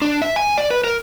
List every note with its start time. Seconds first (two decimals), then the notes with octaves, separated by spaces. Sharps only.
0.02 D4
0.22 E5
0.36 G#5
0.58 D5
0.71 B4
0.84 A#4